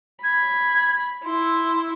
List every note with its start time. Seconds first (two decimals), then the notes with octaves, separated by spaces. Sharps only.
0.24 B5 G#6
1.25 E4 C6